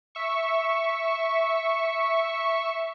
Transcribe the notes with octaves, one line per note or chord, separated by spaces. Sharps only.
E5 C#6